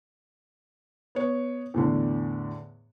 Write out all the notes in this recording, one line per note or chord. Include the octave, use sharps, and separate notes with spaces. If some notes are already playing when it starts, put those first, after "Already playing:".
B3 C#5
E2 A2 D3